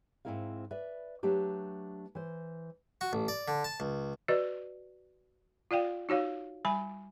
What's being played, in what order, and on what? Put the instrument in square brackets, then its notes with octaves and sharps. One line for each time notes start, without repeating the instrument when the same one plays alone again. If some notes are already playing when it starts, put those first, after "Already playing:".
[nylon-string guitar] G#2 E3 C4 E4 A#4 F5
B4 D5 E5
F#3 A3 D4 G4 B4
E3 C5
[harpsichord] F#4
A1
D5
D3
A5
C#2
[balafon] F#4 B4 D5 D#5
F4 D5 F5 G5
D#4 F#4 C#5 F5
G3 G#5 B5